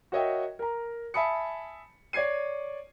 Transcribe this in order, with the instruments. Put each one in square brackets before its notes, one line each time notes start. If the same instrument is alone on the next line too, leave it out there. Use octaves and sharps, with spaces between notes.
[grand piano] F#4 A#4 C#5 D#5 E5 G5
A#4 A#5
E5 G#5 A5 B5 D#6 C#7
C#5 D5 G#6 C7 D#7